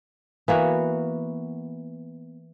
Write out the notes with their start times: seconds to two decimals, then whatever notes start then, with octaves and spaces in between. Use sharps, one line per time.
0.48 E3 A#3 B3 F#4